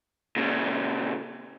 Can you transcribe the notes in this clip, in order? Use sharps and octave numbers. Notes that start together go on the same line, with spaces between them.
A#2 C#3